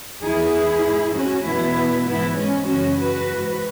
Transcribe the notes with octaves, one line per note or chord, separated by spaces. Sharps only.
E2 E3 E4 G#4
G#2 E3
C#4 F#4
E2 B2 F#3 B3 E4
G#2 E3 B3 E4
G#3 C#4
F#2 C#3 E3 C#4 F#4
F#4 B4
G#2 E3